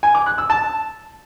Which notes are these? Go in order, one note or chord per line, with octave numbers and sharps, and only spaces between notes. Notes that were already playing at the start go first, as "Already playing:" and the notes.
G#5
D6
F#6
E6
A5